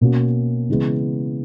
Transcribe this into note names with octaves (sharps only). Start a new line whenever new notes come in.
B2 A#3 C#4 F#4
C#3 E3 G#3 B3